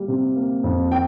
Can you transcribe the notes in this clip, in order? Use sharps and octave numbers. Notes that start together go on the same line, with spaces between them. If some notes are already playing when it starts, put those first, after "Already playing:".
Already playing: G3 A#3
C3
A#3
F2
G5